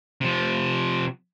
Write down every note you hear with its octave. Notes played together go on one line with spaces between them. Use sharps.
C3 F3